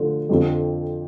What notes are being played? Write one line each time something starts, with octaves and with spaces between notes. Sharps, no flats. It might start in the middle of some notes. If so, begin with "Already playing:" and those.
Already playing: D3 F3 A3
F2 D3 F3 C4